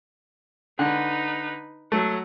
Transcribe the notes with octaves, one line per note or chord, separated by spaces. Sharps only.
D3 D#4 B4
F#3 A3 F#5